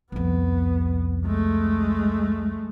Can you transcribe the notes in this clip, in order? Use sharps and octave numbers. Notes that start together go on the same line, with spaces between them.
C2 F2 B3
G#3 A3